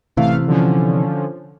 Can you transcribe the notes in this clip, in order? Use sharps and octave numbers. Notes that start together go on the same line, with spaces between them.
A1 C3 E3 A3 F5
D3 F3 C#4